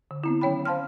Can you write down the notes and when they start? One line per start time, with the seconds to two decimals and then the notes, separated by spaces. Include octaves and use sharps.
0.11 D3
0.24 B3 C4 E4
0.41 D#3 F#3 C#4 C#5 G5 B5
0.65 C5 F5 A5 C6 F6